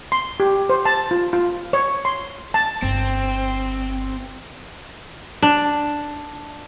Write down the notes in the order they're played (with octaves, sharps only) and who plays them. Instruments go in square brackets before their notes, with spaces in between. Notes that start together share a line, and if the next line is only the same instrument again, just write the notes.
[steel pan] C6
G4
C5
A5
F4
F4
C#5
C6
A5
[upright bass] G1 [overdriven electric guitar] C4
[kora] D4